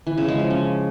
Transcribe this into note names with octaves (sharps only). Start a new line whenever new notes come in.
E3
C#3
G#3
F3
C#4